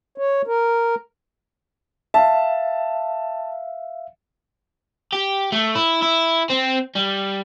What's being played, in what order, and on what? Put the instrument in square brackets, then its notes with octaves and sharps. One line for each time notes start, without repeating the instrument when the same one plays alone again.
[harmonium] C#5
A#4
[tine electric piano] E5 F5 [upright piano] A5
[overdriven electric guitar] G4
A3
E4
E4
C4
G3